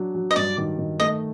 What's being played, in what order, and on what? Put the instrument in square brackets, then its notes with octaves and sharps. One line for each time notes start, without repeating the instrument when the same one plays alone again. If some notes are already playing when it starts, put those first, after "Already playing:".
Already playing: [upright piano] F#3 D4
F#3
[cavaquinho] D#5
[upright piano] G2 [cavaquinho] D5
[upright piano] D#3
D#3
[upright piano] A3 [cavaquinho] D#5